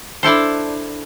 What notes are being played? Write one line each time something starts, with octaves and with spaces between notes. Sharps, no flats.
D4 E4 A4 C5